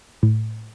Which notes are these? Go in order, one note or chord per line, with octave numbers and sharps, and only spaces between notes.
A2